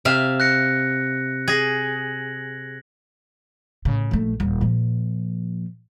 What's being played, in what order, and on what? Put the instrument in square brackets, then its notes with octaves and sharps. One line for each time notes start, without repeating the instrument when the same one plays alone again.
[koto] C3 E5 F5
[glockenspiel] F#6 A#6 C#7
[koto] G#4 [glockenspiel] G#6 A#6 F#7
[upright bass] A2 C#3
A#1 A3
D#1
A#2 F3